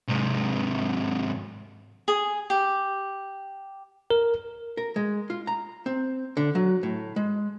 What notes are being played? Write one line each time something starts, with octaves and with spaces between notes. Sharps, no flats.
G#2 C3
G#4
G4
A#4
A#4
G#3
F4
A#5
C4
D3
F#3
A2
G#3